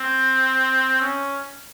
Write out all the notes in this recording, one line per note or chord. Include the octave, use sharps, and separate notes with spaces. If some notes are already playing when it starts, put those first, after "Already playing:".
Already playing: C4
C#4